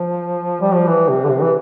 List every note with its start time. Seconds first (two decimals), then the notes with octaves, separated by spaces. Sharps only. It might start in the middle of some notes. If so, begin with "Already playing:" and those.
Already playing: F3
0.61 G3
0.74 F3
0.87 E3
1.09 C3
1.24 D3
1.29 C3
1.42 E3